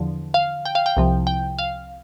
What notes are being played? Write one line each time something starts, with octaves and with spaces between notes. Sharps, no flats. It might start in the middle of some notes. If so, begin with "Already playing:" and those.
Already playing: E2 D3 F3
F5
G5
F5
G5
C2 C3 F3
G5
F5